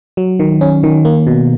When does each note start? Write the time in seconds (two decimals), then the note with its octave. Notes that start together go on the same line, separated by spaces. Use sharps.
0.17 F#3
0.39 D#3
0.61 C#4
0.83 D#3
1.05 A#3
1.27 B2